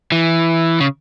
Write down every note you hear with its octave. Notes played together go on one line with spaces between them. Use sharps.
E3
C#3